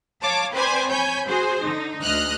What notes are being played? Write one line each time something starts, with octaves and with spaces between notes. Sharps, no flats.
C#5 F5 A5 D6
C4 B4 C5 D5 G#5
C#5 G#5 B5 G6
F#4 G#4 C5
D3 D#4
D2 D#5 F6 F#6